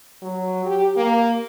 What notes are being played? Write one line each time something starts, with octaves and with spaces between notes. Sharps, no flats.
F#3
G4
A#3